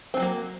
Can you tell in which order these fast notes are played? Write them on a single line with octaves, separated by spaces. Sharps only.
C4 E3 F#3 A#3